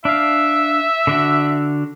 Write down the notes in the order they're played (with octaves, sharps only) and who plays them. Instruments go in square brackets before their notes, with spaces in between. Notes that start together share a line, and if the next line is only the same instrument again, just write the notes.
[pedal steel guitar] D4 F5 [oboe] E5
[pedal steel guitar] D3 D4 F#4